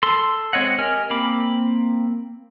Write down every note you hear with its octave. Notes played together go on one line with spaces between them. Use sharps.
A4 C6
G#3 C4 C#5 D#5 F#5
G4 A#4 D#5 G#5 F6
A#3 C4 B5 D6